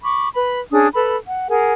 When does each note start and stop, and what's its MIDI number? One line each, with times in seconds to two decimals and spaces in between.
0.03 0.28 83
0.03 0.28 85
0.03 0.28 86
0.34 0.59 71
0.34 0.59 83
0.71 0.87 61
0.71 0.87 62
0.71 0.87 68
0.71 0.87 87
0.93 1.16 69
0.93 1.16 71
0.93 1.16 83
1.28 1.48 78
1.49 1.73 68
1.49 1.73 70
1.49 1.73 78
1.49 1.73 80